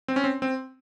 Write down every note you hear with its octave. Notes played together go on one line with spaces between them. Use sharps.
C4
C#4
C4
C4